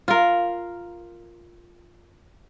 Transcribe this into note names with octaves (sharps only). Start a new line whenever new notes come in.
F4 A#4